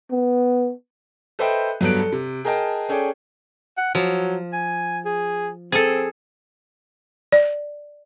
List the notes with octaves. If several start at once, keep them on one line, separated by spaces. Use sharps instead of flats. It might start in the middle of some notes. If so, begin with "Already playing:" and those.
B3
A4 B4 C5 D#5 E5 G5
G2 F#3 B3 A4 F#6 D7
A4
C3
G#4 A#4 D#5 G5 A5
C#4 G#4 A4 D5 G5
F#5
F3 F#3
G#5
G#4
C4 G#4 A4
D5